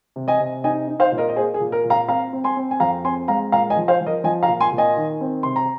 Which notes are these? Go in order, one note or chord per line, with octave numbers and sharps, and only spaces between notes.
C3
D#5 G#5
C3
D#4 D#5 G#5
D#4
C5 F5
A#2
A#4 D#5
D#5
A#3 G#4 C5
G#4
A#2
A#4
A#2
F5 A#5
C4 F5 A#5
C4
G#5 C6
C4
G#5
F2 F5 A#5
C4 G#5 C6
G#3 F5 A#5
A#2 F5 A#5
D#5 G#5
F3
C5 F5
F3
A#4 D#5
F3 D#5 G#5
F5 A#5
A#2
G#5 C6
A#2
D#5 G#5
D#3
C4
C3 C6
A#5